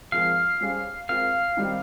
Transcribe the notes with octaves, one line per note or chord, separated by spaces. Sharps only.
F3 G#3 C4 F4 A#4 F5
G3 C#4 G#4 C5
G#3 C4 F4 A#4 F5
D#3 G3 C4